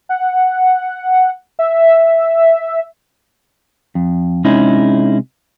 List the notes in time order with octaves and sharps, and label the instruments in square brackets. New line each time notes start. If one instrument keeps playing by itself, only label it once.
[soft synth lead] F#5
E5
[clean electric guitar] F2
C3 G#3 C#4 D#4 E4 G#4